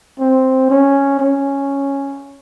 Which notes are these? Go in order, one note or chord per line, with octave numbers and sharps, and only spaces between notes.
C4
C#4
C#4